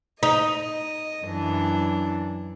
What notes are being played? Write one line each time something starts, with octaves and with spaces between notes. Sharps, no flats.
D#4 D#5
F#2 E3 D4